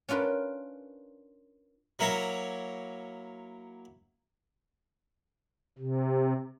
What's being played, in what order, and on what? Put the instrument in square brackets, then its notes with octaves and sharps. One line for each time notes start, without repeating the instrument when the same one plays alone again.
[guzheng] C#4 D4 F4 A#4 B4
[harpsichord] F#3 A#3 E4 C#5 A#5
[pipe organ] C3